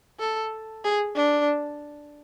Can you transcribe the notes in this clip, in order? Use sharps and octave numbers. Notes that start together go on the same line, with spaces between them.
A4
G#4
D4